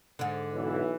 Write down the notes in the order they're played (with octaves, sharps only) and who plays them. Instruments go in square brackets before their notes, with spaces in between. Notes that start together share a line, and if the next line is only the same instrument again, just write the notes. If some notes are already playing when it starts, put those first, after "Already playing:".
[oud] G#2 D3
[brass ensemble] B1 E3